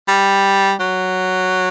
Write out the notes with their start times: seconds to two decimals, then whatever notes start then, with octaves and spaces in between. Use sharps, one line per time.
0.08 G3
0.80 F#3